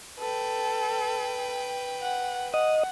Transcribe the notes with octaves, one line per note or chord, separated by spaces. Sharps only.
A4 B4 G5
F#5
D#5 F#5